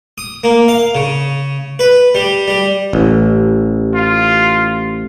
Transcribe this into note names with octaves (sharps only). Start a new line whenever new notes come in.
D#6
A#3
F5
C#3
B4
G3
G3
A1
F4